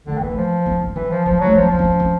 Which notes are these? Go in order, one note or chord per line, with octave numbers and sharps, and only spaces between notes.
D3 A3
D#3 E3 A#3
A3
F3
B3
G3
E3 F#3
F3
F3 F#3
F#3 A3
F3 C#4
F3 D4
C4
C#4
C#4